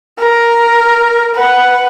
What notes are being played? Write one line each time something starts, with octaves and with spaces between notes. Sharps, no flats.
A#4
B4 F#5